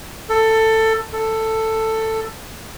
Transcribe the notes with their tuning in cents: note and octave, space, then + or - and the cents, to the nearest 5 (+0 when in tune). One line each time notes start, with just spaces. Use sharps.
A4 +15
A4 +10